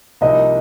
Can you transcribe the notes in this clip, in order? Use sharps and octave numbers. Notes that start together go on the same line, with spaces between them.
C2 C3 F3 A#3 D#4 D#5